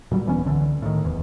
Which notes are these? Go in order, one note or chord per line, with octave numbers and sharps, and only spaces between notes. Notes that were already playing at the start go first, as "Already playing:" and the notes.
A#2 F#3 G3
D#1 E3 B3 C#4
C2 D3 E3
A2 D#3
D#1 A#1 E2